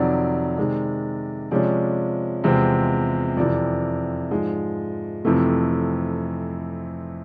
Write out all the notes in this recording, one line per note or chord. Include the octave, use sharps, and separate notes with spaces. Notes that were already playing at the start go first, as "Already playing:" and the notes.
Already playing: F2 C3 D#3 F#3 D5
C3 D#3 G#3
C3 F3 G#3 C#4 D5
E2 C3 F3 G#3 C4
F2 C3 E3 D5
G#2 F3 G#3
F2 C3 E3 A3